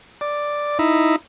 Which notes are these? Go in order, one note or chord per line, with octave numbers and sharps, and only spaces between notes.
D5
D#4 E4